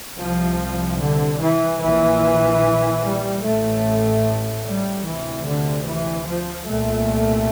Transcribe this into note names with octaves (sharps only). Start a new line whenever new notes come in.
C2 C3 F3
D3
E3
A#1 A#2 E3
G3
A1 A2 A3
G3
D2 C3 E3
D3
E3
F3
C2 A#2 A3